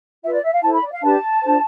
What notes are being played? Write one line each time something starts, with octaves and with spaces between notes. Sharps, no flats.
F4 B4 E5
D5
E5
F5
E4 A4 C5 A5
B5
D5
F5
D4 G4 B4 A5
D4 F4 A4 C5